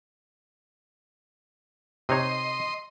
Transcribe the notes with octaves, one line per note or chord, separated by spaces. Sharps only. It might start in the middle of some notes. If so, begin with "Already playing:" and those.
C3 D#4 C#5 D#5 C6